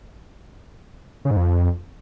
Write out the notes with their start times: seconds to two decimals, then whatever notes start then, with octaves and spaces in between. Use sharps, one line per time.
1.25 C#3
1.31 G#2
1.37 F2